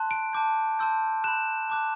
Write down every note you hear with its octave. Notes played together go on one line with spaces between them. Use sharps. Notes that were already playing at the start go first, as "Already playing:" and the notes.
Already playing: A5 C6 F#6
D7
A5 D6 G6
A5 C6 E6 G6
B5 F#6 E7
A5 D6 F#6